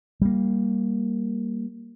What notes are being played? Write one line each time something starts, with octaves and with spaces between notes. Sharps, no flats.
G3 A#3